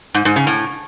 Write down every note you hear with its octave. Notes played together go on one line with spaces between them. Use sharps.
G#2
G#2
C#3
A2